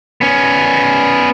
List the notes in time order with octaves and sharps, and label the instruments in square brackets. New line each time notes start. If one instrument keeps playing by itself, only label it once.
[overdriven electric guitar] B3 C#4